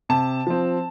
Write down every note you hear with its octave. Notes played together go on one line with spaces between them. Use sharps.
C3 A5
F3 C4